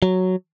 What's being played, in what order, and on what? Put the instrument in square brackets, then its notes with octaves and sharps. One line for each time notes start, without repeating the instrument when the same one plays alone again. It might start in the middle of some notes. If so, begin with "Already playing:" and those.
[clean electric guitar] F#3